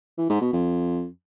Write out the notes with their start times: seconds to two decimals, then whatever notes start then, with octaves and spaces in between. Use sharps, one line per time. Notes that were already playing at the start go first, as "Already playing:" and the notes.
0.18 E3
0.29 G#2
0.41 B2
0.53 F2